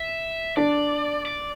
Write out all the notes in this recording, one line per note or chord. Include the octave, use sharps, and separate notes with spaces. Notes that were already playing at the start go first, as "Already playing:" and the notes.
Already playing: E5
D4 D5
D5